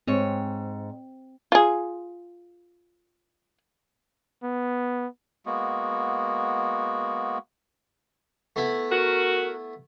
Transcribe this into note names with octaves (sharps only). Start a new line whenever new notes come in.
G#2 C4 C#5
F4 G#4
B3
G#3 A#3 B3 F#4
A3 B3 E4
F#4 A#4